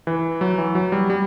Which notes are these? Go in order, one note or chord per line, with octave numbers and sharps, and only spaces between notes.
E3
F#3
E3
F#3
G3
G3